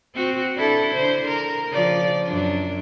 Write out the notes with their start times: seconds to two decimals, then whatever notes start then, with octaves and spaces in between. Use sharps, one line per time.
0.15 C4 F#4
0.56 D4 E4 A4
0.94 D3 C5
1.28 A#4
1.69 C#3 F3 D5
2.25 F#2 D4